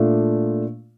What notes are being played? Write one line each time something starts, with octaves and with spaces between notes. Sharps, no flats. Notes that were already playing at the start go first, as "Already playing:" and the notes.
Already playing: A#2 A3 D4 F4